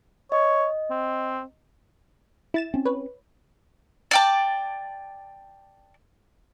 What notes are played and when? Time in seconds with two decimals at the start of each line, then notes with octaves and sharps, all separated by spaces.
0.32 C#5 D#5
0.90 C4
2.54 E4 A6 E7
2.74 C4 C#4
2.85 B4 C#5
4.11 D5 G5 A5